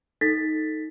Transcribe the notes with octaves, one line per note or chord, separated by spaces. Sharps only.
D#4 A4 A6 B6